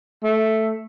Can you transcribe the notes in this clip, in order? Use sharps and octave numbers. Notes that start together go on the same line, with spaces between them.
A3